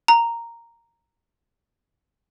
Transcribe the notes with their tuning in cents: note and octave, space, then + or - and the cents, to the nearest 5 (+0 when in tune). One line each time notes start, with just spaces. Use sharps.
A#5 -5